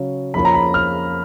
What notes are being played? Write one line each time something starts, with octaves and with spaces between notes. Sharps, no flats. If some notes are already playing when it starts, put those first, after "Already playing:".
Already playing: C#3 F#3 C#4
F2 F3 A#3 C#4 B5
A#5
B5
F6